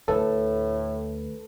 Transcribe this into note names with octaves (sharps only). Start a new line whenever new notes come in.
D2 A2 A4 B4